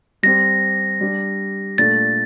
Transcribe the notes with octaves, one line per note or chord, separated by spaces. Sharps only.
G3 C4 G4 A#6
G3 D4 G4
A#2 A3 D4 A6